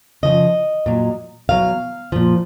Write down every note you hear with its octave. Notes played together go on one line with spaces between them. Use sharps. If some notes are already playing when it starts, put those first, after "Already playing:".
C#3 F3 D#5
A#2 F#3
B2 F#3 F5
A#2 F3